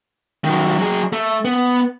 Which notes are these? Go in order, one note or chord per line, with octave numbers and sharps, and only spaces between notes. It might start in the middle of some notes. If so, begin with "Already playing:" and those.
D#3 F#3
F#3 G#4
A3
B3